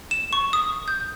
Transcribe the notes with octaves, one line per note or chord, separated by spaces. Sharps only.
E7
C#6
D#6
G6